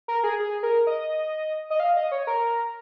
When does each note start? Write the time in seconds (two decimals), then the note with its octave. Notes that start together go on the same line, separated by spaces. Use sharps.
0.08 A#4
0.23 G#4
0.39 G#4
0.63 A#4
0.87 D#5
1.70 D#5
1.80 F5
1.97 D#5
2.12 C#5
2.27 A#4